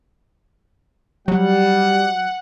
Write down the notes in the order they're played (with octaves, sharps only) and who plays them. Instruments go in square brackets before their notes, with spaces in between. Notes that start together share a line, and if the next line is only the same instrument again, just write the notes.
[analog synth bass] F#3 [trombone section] G3 [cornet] F#5